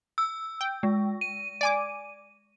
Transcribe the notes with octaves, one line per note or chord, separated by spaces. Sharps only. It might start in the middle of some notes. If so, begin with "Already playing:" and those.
E6
G5
G#3
D#7
D5 G#5 D6